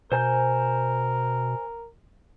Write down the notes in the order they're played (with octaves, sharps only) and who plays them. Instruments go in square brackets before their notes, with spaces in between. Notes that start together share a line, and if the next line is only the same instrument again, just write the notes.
[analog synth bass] B2 [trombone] A#4 [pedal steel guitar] C5 G#5 G6